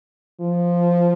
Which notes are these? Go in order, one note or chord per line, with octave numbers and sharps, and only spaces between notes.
F3